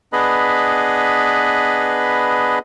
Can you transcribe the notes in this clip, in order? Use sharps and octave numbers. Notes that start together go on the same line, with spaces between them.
B3 D4 G#4 B4 D#5 B5